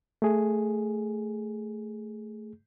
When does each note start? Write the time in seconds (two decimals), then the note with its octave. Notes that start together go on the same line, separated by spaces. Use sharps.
0.22 A3 G#4